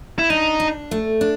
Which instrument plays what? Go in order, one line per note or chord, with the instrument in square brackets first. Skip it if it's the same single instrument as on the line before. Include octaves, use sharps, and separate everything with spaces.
[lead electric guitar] E4
[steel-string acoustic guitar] D4 [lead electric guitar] D#4
[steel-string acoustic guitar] D4
A3
D4